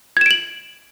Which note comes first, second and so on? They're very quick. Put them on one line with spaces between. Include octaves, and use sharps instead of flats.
G#6 E7 D7 F#7